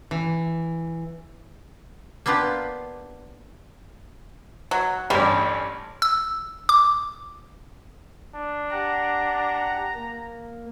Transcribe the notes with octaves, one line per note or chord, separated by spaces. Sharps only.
E3
A#3 B3 D4 F4 G4
F#3
A1 G2 G3
E6
D6
D4
G4 F#5 A#5
A#3